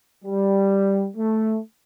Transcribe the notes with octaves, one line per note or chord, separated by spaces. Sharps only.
G3
A3